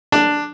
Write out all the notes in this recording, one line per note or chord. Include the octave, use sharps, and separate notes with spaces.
D4